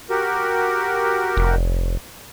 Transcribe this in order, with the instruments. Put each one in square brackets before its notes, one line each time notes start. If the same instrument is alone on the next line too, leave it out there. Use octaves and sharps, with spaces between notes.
[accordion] F#4 G4 A#4
[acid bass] F1